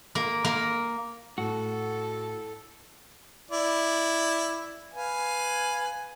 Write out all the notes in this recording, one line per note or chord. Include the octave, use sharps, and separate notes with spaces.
A#3
A#3
A2 F#4 A4
E4 D5
B4 F5 G#5